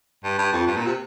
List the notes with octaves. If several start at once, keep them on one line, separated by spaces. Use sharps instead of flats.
G2
G2
F2
G2
A#2
C3